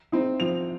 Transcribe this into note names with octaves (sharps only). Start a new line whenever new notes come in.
C4 D#4
F3 F7